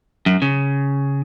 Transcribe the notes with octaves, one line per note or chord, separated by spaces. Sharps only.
F#2
C#3